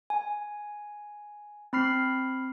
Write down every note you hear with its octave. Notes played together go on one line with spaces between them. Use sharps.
G#5
C4 B5 F6 C7